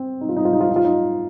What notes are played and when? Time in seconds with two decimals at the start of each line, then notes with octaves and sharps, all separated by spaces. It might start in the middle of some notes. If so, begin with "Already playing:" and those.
Already playing: C4
0.21 D#4
0.29 F4
0.36 D#4
0.45 F4
0.53 D#4
0.61 F4
0.69 D#4
0.76 F4
0.85 D#4